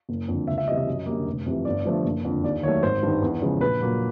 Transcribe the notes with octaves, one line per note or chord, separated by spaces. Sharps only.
F#1
F2 D3
C#2 E5
E5
C3 E3 G3 D#5
D#5
F#2
D3 G3 A#3
F1
F2 C3 E3
G1 D5
G2 D3 F3 A3
F#1
F2 D3
D#2 D5
D#3 F#3 A3 C#5
G#1 C5
G2 D#3
E2
C#3 F3 G#3
A#1 B4
A#2 F#3 A#3